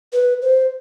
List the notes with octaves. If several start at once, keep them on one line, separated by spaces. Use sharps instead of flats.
B4
C5